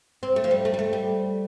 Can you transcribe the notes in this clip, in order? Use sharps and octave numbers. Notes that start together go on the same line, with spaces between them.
C4
A3
F3
G3
A3
G3
A3
G3